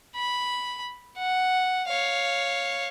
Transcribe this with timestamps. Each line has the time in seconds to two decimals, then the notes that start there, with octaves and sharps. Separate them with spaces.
0.16 B5
1.18 F#5
1.88 C#5 F5